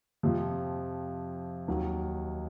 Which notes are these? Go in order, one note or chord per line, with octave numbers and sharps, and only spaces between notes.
F2 C3 F3
D#2 D#3 F#3